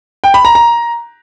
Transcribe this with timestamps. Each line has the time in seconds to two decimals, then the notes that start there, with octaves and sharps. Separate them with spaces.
0.24 G5
0.34 B5
0.45 A#5
0.55 A#5